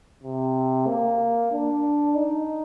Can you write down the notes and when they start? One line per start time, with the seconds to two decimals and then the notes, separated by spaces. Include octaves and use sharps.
0.23 C3
0.87 A#3
1.52 D4
2.15 D#4